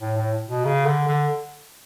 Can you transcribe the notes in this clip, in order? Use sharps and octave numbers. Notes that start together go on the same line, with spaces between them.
A2
A2
B2
C#3
D3
D3